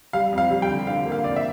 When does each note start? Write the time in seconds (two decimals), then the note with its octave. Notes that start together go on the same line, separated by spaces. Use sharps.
0.13 G3 F5
0.32 F2
0.38 F5
0.50 G3
0.62 G5
0.69 D3
0.87 D3 F5
1.06 A#3
1.12 F5
1.24 F2 D5
1.36 E5